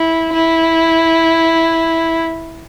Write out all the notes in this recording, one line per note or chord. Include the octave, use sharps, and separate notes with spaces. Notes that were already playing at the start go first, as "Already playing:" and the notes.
Already playing: E4
E4